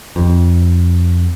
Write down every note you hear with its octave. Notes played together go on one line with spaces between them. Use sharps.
F2